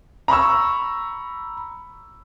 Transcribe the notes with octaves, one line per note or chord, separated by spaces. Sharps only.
A#5 B5 C#6 E6